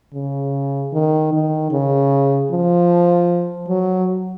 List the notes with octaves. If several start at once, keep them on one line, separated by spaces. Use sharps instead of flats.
C#3
D#3
D#3
C#3
F3
F#3